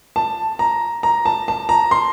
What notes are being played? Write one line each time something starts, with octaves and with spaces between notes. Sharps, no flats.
A5
A#5
A#5
A5
A5
A#5
C6